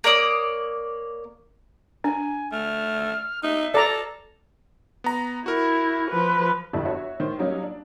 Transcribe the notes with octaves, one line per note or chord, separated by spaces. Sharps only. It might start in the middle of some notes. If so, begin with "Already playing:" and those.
A#3 C#5 D5 D#6
D4 G#5
A3 F6
D#4 E5
A4 D5 A#5
B3 A#5
E4 F#4 A#4
F3 B4
G1 F2 D4 E4 E5 A5
F#4 C#5 E5
D#3 C5
F#3 G3 A#3 C#4 D#4 F#4
D4